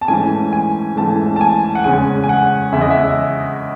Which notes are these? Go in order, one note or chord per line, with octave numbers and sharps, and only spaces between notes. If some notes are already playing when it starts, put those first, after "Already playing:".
A5
G#2 E3 A3 C#4 G#5
G#5
G#2 E3 A3 C#4 A5
A5
G#5
F#5
E2 C#3 G#3 C#4 G#5
G#5
F#5
E2 C#3 G#3 C#4 E5
D#5
E5